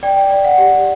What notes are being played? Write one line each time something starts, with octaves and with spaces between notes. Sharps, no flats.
D5 G5
D5
F#5
G4